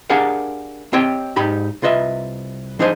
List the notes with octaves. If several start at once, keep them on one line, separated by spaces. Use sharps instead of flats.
D4 G4 G#4 A#4 F5 F#5
C4 G4 C#5 D#5 G5
G#2 D#4 G4 B5
C2 F4 B4 D#5 E5
F3 D4 D#4 G#4 C5 D#5